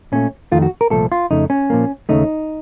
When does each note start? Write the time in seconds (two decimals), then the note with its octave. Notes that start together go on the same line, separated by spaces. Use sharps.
0.12 A#2 A3 C#4
0.52 F2 D#3 A3 F4
0.62 F#4
0.81 A#4
0.91 C2 A#2 F3 A3 A4
1.12 F4
1.30 F2 C#3 A3 D#4
1.50 C#4
1.70 A#2 F3 A#3
2.09 D#2 C#3 A3 D#4